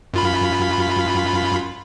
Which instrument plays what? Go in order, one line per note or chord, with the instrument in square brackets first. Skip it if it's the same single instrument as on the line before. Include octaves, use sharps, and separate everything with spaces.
[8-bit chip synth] F#2 F4 B5